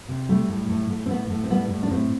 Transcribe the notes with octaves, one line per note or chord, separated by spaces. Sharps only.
C3
G3 A3
A2
A2
A2
C4
A2 B3
A2
C4
G3 B3
A2
D4
A2 C4